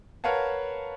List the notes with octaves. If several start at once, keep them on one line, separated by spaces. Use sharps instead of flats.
A#4 B4 C#5 F5 F#5 A5